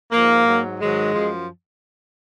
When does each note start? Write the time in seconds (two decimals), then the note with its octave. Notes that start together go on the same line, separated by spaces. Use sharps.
0.11 G#2 F3 A#3
0.46 G#2 F#3
0.80 G#2 D#3 F#3 G#3
1.14 F#2 F3